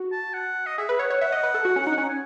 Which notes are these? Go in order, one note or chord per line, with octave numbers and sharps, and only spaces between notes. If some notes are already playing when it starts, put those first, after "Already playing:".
Already playing: F#4
A5
F#5
D#5
G#4 E5
B4
C#5 F#5
C#5
E5 F#5
D#5
B4
A4
F#4
C#4
D#4
C#4
G#5